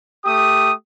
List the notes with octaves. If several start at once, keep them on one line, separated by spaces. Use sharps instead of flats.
A3 G4 D#6